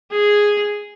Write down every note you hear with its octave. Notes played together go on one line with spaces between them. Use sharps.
G#4